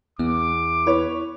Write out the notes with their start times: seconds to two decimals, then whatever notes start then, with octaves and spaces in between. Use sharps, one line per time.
0.19 E2 B3 D6
0.87 E4 B4 C#5